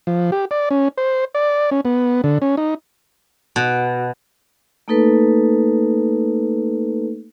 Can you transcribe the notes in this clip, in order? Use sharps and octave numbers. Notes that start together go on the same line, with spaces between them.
F3
G4
D5
C#4
C5
D5
C#4
B3
D3
C#4
D#4
B2
A3 A#3 D#4 A4 B4